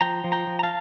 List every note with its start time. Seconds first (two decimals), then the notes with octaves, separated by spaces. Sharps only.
0.01 F3 G5 A#5
0.24 F3
0.32 G5 A#5
0.47 F3
0.59 A#5
0.63 F5 A5